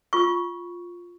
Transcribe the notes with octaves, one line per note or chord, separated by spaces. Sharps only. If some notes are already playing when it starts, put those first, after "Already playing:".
F4 C#6